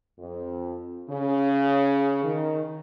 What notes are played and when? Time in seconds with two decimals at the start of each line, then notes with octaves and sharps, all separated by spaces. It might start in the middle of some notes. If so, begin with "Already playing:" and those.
0.18 F2
1.10 C#3
2.23 D#3